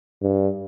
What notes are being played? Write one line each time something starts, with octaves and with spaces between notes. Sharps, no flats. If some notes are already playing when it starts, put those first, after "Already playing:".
G2